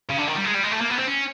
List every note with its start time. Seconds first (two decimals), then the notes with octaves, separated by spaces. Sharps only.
0.09 C#3
0.17 D3
0.27 D#3
0.35 G3
0.44 G#3
0.54 G3
0.63 G#3
0.71 A3
0.81 A#3
0.90 B3
0.98 C4
1.07 C#4